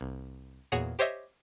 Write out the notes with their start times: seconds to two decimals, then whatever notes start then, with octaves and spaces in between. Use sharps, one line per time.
0.01 C2
0.72 E2 A#2 F#4 G#4 C#5 C#7
0.99 G4 C5 C#5 D#5 E5